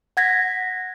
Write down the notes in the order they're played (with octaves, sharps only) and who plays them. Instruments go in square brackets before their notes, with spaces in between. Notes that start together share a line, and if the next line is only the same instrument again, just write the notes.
[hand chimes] F#5 G#6 A#6 B6